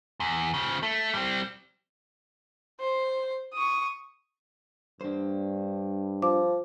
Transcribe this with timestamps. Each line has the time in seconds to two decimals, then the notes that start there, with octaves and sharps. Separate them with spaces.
0.20 E2
0.54 C#3 F3
0.83 A3
1.14 G3 C4
2.80 C5
3.53 C#6 D#6
5.01 G2 D4 C5
6.22 F3 D6